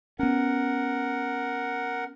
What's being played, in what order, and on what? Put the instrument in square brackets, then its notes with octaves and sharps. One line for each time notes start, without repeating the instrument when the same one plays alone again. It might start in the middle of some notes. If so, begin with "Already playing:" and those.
[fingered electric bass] B3 C#4 [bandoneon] A#4 F#5